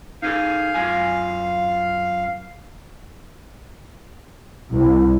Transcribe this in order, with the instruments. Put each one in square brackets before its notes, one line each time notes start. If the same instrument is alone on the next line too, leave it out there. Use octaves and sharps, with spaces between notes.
[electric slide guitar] D#4 G#4 A4 [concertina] F5
[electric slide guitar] F#2 F4 G#5
[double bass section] C2 [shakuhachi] E4